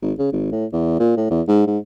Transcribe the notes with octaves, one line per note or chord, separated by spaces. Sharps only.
G#1
C#3
G#1
A2
E2
A#2
A2
E2
G#2
G#2